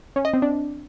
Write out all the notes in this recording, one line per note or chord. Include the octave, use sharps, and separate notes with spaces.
C#4
D#5
C4
D4